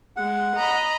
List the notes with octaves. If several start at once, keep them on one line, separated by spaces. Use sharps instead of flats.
G#3 F#5
D#5 A#5 B5